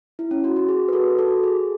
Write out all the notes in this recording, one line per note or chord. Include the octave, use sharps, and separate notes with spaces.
E4
C#4
F#4
F#4
G#4
B4
F#4 A4
F#4 A4
G#4